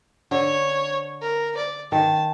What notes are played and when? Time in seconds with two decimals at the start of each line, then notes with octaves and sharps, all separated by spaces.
0.31 D3 C#5
1.22 A#4
1.57 D5
1.92 D#3 A5